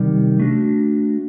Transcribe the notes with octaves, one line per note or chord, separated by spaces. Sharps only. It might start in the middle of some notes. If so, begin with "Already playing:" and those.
Already playing: C3 D#3 G3
A3 D4 F#4